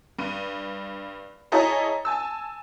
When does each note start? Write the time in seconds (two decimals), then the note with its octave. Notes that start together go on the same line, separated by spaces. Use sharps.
0.19 G2 D#7
1.52 E4 G#4 A4 C#5 D#5 A#5
2.05 G#5 A5 E6